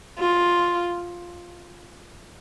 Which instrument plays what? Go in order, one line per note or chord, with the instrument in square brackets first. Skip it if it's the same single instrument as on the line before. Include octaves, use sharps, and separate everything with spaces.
[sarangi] F4